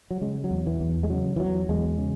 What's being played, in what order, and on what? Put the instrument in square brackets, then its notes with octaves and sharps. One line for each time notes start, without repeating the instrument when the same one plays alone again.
[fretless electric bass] F#3
C#3 G#3
F#3
E2
E3
E2
G#3
C#3 F#3
E3
E2 F#3
E2 G#3
C#3